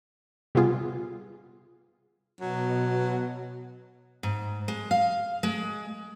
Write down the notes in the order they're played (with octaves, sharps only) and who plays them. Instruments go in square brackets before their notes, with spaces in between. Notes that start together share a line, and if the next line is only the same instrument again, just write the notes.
[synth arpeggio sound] C3 G3 B3 F4 G#4
[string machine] B2 [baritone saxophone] F#3
[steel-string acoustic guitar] G#2
G#3
F5
G#3